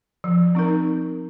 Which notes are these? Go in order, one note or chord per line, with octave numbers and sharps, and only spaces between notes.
F3
C4 D#4 A#4